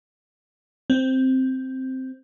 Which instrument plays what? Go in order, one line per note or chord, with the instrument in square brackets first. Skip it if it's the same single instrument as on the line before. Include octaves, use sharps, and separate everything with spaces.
[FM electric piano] C4